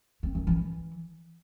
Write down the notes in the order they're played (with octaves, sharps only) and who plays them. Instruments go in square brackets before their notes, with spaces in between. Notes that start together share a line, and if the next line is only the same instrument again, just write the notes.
[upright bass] C4
D#3
E3